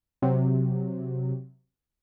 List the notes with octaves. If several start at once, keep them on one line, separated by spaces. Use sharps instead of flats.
C3 F#3